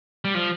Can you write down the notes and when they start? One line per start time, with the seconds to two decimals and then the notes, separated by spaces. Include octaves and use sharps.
0.25 G3
0.34 F3